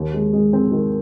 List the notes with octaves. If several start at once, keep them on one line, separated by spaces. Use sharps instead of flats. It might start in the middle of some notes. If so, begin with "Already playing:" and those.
Already playing: D#2
G#3
G#3
C4
D#3